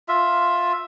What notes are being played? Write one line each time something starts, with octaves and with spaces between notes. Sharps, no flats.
F4 E5